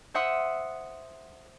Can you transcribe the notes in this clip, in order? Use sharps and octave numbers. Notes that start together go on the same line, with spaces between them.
C5 E5 F#5 C6 D#6 E6